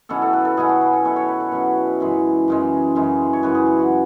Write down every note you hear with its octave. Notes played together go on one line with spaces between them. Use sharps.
B2 F#3 C#4 E4 A4
A4
B4
A4
B2 F#3 C#4 E4 G#4
F#4
G#4
A4
B2 F#3 C#4 E4 C#5
C#5
B4
A4
B2 F#3 C#4 E4 B4
F#2 C#3 E3 G#3
F#2 C#3 E3 G#3
F#2 C#3 E3 G#3
C#5
F#2 C#3 E3 G#3 B4
G#4
E4
F#4